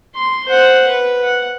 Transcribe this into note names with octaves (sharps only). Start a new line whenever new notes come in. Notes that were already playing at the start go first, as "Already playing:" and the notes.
C6
C5 F#5
B4
F#5